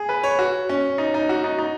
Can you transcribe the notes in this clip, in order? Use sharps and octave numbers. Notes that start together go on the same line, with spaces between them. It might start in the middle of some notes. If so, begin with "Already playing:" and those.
Already playing: G#4
B4
C#5
F#4
C#4
D#4
D#4
F#4
D#4
D#4